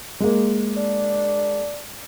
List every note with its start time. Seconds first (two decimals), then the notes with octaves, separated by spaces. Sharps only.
0.20 G#3 A#3
0.76 D4